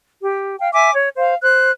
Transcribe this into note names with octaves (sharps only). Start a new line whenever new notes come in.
G4
F5 G5
E5 G#5 D6
C#5
C5 F5
C5 F#6